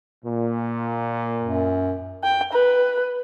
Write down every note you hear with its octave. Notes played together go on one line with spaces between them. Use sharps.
A#2
F#2
G5
B4